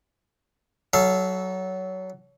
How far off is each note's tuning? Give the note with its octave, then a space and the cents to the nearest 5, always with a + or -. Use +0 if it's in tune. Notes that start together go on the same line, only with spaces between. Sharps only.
F#3 +20 A4 -20 F5 -35